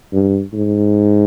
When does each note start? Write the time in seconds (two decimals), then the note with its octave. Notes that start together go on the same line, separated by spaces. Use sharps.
0.13 G2
0.54 G#2